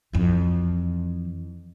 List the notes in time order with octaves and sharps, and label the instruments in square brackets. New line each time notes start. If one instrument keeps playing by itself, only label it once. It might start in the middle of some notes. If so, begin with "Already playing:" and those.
[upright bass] F2 E3